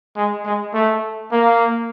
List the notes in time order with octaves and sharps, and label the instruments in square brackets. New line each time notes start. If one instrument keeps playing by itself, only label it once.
[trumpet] G#3
G#3
A3
A#3